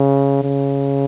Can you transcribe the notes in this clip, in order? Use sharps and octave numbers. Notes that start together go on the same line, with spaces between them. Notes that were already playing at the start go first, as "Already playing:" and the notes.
Already playing: C#3
C#3